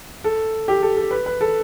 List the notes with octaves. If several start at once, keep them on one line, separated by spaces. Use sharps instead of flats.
A4
G4
A4
A4
B4
B4
A4